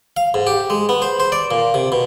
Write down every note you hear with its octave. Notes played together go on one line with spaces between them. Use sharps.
F5
G#2
G4
G#3
B3
C5
C5
D5
A#2
C3
B2